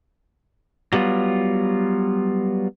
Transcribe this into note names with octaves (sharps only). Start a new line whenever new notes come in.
F#3 G3 B3 F4